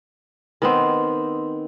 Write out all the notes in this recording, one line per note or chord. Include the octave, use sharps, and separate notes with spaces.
D#3 B3 C4